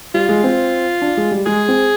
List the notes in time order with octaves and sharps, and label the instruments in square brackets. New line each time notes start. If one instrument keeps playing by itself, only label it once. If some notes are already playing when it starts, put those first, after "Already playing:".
[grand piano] G3 [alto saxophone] F4
[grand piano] G#3
C4
D4
G#3
G3
[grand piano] G#3 [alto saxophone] G#4
[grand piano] C4